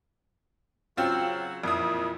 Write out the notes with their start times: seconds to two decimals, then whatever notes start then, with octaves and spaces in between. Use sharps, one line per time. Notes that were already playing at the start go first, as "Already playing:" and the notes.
0.97 C#3 F#3 C4 F4 F#4
1.64 F2 A#2 E3 D#6